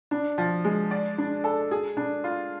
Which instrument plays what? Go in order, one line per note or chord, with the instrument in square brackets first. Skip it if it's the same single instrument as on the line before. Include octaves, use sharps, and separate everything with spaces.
[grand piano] D4
F3
G#3
D5
D4
A4
G#4
D4
F4